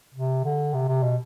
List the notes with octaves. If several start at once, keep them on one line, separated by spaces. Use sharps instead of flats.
C3
D3
C3
C3
B2